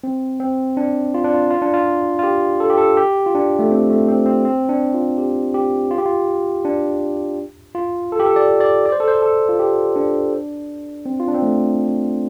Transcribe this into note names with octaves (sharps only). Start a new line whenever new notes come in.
C4
C4
D4
F4
D4
F4
F4
D4
F4
F4
G4
A4
G4
A4
G4
F4
D4
A3
C4
A3
C4
C4
C4
D4
F4
G4
G4
F4
G4
F4
D4
F4
A4
G4
A4
D5
D5
D5
C5
A4
C5
A4
F4
G4
D4
C4
F4
D4
C4
A3